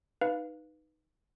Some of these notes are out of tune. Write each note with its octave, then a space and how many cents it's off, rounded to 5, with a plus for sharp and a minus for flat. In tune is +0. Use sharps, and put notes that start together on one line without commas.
D#4 +0 B4 +0 F5 +0